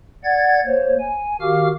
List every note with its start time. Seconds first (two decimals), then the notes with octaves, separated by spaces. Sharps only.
0.24 D5 F#5 G#6 A6
0.65 A#3 C5 C#5
1.00 G#5
1.41 D#3 F#4 G4 F5 D6 F6